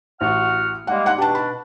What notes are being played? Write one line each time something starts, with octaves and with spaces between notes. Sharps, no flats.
A1 F#4 F#5 F6
G3 G#3 A#3 F#5
F#5 F#6
B2 D4 G4 A5
B5